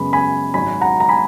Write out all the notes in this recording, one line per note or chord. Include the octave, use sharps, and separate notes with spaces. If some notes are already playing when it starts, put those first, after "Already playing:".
Already playing: F#2 C#3 G#3 B3 B5
G#5 B5
G#1 G#2 F#3 G#5 B5
F#5 A#5
A#5
G#5 B5